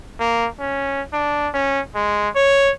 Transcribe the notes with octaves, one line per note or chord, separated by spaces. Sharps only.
A#3
C#4
D4
C#4
G#3
C#5